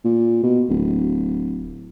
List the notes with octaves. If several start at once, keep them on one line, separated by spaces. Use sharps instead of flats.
A#2
B2
D1